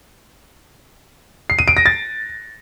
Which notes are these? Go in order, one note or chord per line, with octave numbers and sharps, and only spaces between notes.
C7
D#7
D7
A#6
A6